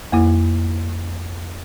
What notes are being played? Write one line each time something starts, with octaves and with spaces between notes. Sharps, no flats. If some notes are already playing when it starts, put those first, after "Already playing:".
F2 A#3 E4